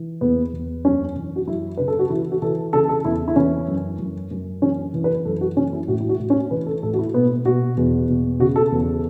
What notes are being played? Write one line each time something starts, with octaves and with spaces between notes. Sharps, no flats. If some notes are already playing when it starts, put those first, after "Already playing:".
Already playing: E3
E2 B3
E2
F#2 C#4
E3
F#4
F#2 E4
C#3 B4
A4
F#4
E3 E4
F#4
E3 A4
C#3 A4
A4
E2 E4
E4
E3 C#4
F#2
F#2
F#2
E3 C#4
E3
B4
F#2 A4
F#4
E3 C#4
E4
A2 F#4
E4
F#4
A2
C#4
E3 B4
A4
A2 A4
F#4
E4
B2 B3
B2 F#4
E2
B2
C#3 F#4
A4
E2